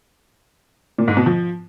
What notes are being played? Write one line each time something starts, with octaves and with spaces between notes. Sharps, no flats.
A#2
G#2
B2
F3